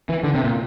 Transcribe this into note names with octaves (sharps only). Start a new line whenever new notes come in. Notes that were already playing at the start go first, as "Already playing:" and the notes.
E3
D3
C3
A#2